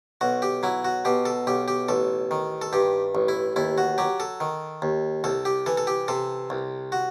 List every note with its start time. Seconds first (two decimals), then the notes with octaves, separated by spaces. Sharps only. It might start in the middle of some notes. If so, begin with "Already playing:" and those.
0.21 B1 F#4
0.42 G4
0.63 F#3 E4
0.85 F#4
1.05 B2 G4
1.25 A4
1.47 B1 G4
1.68 G4
1.89 A1 A4
2.31 D#3
2.62 A4
2.73 G2 G4
3.15 A1
3.28 E4
3.56 D#2 E4
3.78 F#4
3.98 F#3 G4
4.20 A4
4.40 D#3
4.82 D#2
5.24 C2 A4
5.45 G4
5.66 E3 A4
5.77 A4
5.87 G4
6.08 C3 A4
6.50 C2
6.92 F#4